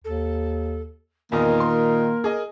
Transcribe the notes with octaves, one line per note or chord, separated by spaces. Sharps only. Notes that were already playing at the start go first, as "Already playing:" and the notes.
D#2 A4
E2 A#2 D#3 A#3 A#4 D#5
C6
G#4 D#5